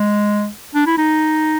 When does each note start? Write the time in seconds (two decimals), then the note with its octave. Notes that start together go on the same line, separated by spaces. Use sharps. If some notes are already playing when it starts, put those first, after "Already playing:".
Already playing: G#3
0.75 D4
0.87 E4
0.98 D#4